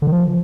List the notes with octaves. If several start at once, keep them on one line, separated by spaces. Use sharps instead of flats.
D3
D#3
F3